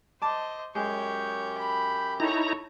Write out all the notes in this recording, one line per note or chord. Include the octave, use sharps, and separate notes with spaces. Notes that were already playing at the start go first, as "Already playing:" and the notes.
C5 D#5 A5 D6
F#2 G#3 G4 C#5 G6
B5
D#4 E4 A4 C#5 A#5